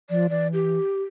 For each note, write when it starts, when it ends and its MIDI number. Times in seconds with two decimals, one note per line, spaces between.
0.10 0.27 53
0.10 0.27 74
0.30 0.78 52
0.30 0.48 74
0.53 1.03 67